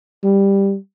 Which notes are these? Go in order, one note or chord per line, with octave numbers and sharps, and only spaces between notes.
G3